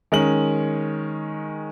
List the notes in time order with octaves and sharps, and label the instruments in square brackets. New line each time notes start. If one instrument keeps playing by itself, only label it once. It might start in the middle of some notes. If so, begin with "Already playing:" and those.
[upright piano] D#3 G#3 C#4 F#7